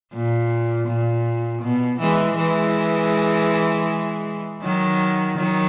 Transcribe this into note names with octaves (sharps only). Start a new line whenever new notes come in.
A#2
A#2
B2
E3 G#3
E3 G#3
D#3 F#3
D#3 F#3